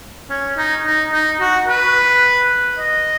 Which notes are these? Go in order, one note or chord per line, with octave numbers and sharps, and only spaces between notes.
C#4
D#4
D#4
D#4
F#4
B4
D#5